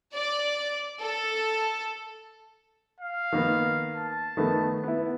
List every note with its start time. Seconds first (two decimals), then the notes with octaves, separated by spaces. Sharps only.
0.13 D5
1.01 A4
3.01 F5
3.32 D#3 A#3 B3
3.96 A5
4.37 D#3 A3 B3
4.83 B3 E4